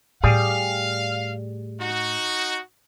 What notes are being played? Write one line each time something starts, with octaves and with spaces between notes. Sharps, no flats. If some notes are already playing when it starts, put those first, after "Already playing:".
A2 G3 G#4 F5
D#4 F#4